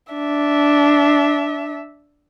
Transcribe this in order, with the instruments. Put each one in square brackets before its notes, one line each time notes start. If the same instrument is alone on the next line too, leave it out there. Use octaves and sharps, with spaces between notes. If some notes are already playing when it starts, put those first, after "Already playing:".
[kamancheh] D4 E5